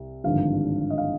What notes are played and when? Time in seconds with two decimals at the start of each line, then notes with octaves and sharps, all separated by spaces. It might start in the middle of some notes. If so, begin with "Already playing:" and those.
Already playing: C2
0.24 G#1 G2 D3 F3 F5
0.90 D#5
0.98 F5